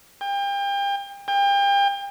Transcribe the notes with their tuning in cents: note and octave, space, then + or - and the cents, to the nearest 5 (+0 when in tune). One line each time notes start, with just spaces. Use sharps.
G5 +35
G5 +35